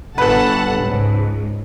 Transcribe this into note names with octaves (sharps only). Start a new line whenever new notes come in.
G1 A4 B4 F#5 A5
C#2 G#2